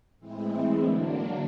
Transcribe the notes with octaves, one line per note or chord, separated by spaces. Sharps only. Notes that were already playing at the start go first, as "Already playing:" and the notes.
A2 E3 G#3 C4 E4
D3 F#3 A#3 D4